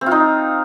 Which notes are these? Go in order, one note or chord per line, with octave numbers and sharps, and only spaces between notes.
C4
F4
D#4